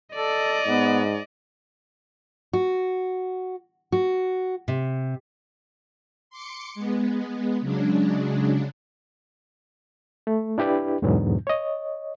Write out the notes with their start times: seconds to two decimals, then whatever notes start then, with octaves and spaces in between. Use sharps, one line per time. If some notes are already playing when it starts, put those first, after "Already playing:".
0.15 A4 D5 D#5
0.67 G#2 B3
2.53 F#4
3.92 F#4
4.68 C3
6.30 C6 D6 C#7
6.75 G#3 B3
7.61 C#3 F#3 G#3 D4
10.27 A3
10.58 D4 E4 G4 B4 D5
11.02 E2 G#2 B2 D3 F#3 B3
11.47 C#5 D#5